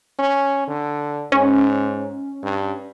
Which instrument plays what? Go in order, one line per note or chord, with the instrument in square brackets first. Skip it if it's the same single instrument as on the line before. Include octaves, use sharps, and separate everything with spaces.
[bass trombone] C#4
D3
[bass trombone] G#2 [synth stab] C#4
[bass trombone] G2